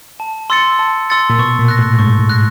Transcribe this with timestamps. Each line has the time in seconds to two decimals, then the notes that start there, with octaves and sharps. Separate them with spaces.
0.20 A5
0.50 C6 E6 A6 C#7
0.79 A5
1.10 C6 E6 A6 C#7
1.30 A#2
1.39 B2 C#6
1.59 A#2
1.68 F#6 A#6
1.79 A2
1.99 G#2 C#6
2.19 A2
2.29 F#6 A#6